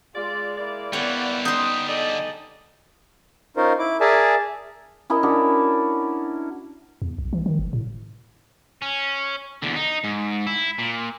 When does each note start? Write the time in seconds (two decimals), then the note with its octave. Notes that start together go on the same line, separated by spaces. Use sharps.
0.15 G#3 F4 D5
0.57 A#3 E4 D5
0.93 D3 G3 B3 C#5 F#5
1.45 D#4 C6
1.87 G#4 A4 D5 D#5
3.57 C#4 D#4 F4 A#4 C5
3.79 E4 D6
4.01 G#4 A#4 D5 E5 G#5 A5
5.10 C#4 E4 A#4 D#5
5.23 C#4 D4 F#4 D5
7.02 E2
7.18 B1
7.33 E3
7.46 D#3
7.59 F#1
7.73 A2
8.82 C#4
9.62 E2 D3
9.76 D#4
10.04 G#2
10.47 E4
10.79 A#2